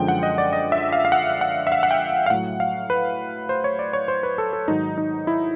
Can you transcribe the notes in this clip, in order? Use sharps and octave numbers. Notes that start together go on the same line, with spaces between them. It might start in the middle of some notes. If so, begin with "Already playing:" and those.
Already playing: F#2 D3 F3 G#3 G5
F#5
D#5
D5
D#5
E5
F5
F5
F#5
F#5
E5
F5
F#5
G5
F5
A2 F#3 F#5
F5
B4
C5
C#5
D5
C#5
C5
B4
A4
A4
G#2 D#3 F#3 D#4
D#4
E4